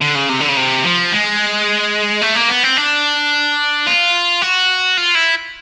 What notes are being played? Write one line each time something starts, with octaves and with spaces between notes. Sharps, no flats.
D3
C#3
C3
D3
C#3
C3
F3
G#3
A3
A#3
B3
C4
D4
F4
F#4
F4
E4